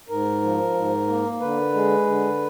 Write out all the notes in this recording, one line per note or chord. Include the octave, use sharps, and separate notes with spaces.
G#2 A#4
F3
G#2
A#3
D3 B4
G#3
D3